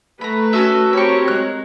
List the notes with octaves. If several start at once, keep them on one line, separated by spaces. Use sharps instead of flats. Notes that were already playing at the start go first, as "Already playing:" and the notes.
A3 B4 A#5 B5
C#4 F#4 A4 E5
C4 G4 A#4 C#5 B5 C#6
G#3 F#6